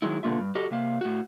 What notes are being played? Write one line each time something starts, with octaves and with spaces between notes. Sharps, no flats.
D#3 F#3 G#3 E4
B2 D3 G#3 A#3 F4 E5
G2
F#4 G4 A4 D#5
C3 A#3 E5 F5
A2 F#4